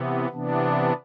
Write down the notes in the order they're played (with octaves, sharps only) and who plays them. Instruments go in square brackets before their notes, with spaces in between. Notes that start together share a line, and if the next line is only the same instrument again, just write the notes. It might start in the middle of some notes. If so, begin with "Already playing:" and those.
Already playing: [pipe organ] C3 E3 B3
C3 E3 B3 D4